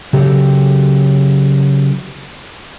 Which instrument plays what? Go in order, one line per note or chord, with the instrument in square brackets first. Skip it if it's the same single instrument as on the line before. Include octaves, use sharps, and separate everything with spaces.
[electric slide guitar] C#3 F#3 G4 A4